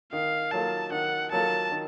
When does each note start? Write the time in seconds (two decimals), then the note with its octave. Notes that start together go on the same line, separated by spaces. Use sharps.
0.13 D#3 F5
0.52 F#3 A#3 F4 A4 A5
0.92 D#3 F#5
1.32 F#3 A#3 F4 A4 A5
1.72 D#3